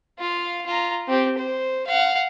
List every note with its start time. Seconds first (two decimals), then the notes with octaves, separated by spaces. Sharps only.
0.19 F4 F5
0.66 F4 A#5
1.08 C4 G4
1.38 C5
1.87 F5 F#5